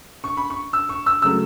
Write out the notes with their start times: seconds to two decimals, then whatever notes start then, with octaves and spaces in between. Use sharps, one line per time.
0.24 C#6
0.37 B5
0.50 C#6
0.73 E6
0.89 C#6
1.06 E6
1.22 C#3 F#3 A3 E6